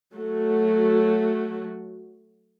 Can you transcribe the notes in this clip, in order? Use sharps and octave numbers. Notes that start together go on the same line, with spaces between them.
F#3 A3 F#4